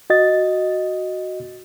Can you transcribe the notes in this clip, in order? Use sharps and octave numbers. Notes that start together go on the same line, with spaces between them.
F#4 D#5 A6